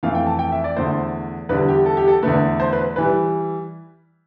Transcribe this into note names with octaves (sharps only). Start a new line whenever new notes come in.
F2 E3 A3 F5
G5
A5
G5
E5
D5
E2 D3 A3 C5
E2 D3 G3 B4
G4
A4
G4
A4
E2 D3 A3 B4
C5
B4
E3 G3 B4